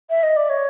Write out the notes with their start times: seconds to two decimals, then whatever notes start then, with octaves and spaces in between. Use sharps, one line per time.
0.10 E5
0.23 D#5
0.37 D5
0.50 C#5